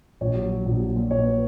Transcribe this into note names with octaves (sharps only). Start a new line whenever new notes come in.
A#1 C#5
F#3
F#3
A#1
F#3
A#2
A#2 C#5
B4